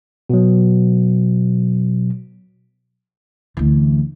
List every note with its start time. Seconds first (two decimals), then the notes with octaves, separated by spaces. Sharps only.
0.29 B2 F#3
3.57 D2 E3